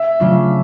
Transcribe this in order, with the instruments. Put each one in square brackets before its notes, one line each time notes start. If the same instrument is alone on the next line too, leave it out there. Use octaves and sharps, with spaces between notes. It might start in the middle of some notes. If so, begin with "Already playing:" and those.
Already playing: [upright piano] E5
[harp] C#3 F#3 A3 D4 F4